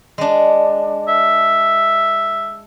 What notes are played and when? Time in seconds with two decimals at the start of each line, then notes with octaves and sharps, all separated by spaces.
0.18 G#3 D4
1.08 E5